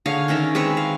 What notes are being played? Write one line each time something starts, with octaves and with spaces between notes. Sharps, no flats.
D3 G#4 C#5 F5
D#3 C#4 A#4 E5
G#3 C4 B4 C#5
F5